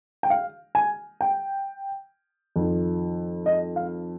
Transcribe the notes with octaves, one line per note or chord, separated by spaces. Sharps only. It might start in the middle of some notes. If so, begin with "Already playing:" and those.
G5
F5
G#5
G5
F2 D#3
D#5
F5